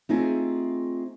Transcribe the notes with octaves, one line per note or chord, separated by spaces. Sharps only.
A3 C4 D#4 F4 G#4 E5